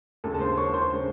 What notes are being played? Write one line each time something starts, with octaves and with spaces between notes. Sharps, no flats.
D#2 C#3 G#3 A4 A5
A5
C5 C6
C#5 C#6
C5 C6
C#3 G#3